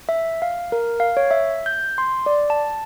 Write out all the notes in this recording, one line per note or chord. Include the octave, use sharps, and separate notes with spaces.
E5
F5
A#4
F5
C#5
E5
G6
C6
D5
A5